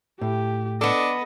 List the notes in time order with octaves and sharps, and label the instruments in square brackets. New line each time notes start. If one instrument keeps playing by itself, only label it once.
[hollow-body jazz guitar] A2 [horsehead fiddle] G4
[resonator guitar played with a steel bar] B3 A4 [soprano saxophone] D4 [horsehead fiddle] D#5